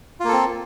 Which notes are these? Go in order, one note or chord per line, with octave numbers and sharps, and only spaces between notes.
A#3 C4 F4 A4